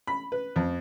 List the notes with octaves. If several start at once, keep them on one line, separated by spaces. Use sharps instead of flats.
B5
B4
F2